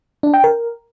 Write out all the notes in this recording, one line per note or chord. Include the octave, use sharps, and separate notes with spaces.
D4
G5
A#4